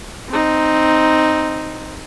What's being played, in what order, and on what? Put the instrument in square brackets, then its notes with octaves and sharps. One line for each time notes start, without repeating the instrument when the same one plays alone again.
[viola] C4 D#4